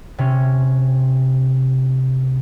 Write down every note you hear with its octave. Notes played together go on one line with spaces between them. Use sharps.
C3 C#4